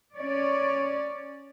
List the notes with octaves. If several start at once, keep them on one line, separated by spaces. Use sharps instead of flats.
C#4 C#5 D5